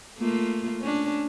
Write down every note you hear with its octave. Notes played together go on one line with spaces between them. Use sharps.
A3 A#3 F4
C#4 D4